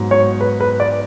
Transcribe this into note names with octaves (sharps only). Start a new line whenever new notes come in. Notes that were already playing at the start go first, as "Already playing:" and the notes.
Already playing: G#2 F#3 B3
C#5
B4
B4
D5